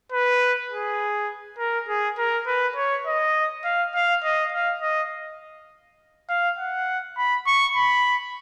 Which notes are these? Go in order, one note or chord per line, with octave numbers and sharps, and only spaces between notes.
B4
G#4
A#4
G#4
A#4
B4
C#5
D#5
F5
F5
D#5
F5
D#5
F5
F#5
B5
C#6
B5